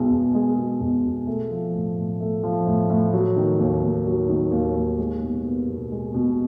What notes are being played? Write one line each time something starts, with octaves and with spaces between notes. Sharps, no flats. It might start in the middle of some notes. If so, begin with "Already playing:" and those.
Already playing: B1 B2 G#3
B1
G#3
B2
B1
B1
A3
F3
A2
A2
A3
F3
A2
A2
F#3
D#3
D#2
D#2
F#3
D#3
D#2
D#2
G#3
B2
B3
B1
G#3
B2